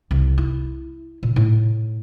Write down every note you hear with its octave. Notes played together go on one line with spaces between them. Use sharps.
C2
E4
A#2
A2